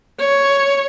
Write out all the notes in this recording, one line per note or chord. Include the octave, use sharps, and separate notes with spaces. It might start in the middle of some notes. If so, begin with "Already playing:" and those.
C#5